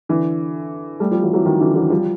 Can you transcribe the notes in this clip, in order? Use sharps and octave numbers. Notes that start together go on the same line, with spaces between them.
D3 E3
G3 A3
F3 G3
E3 F#3
E3 F#3
D#3 F3
D3 E3
E3 F#3
F3 G3